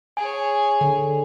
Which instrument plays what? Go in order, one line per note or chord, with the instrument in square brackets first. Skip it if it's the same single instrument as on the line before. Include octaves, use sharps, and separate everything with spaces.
[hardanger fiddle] G#4 C#5 [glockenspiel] G#5
[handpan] D3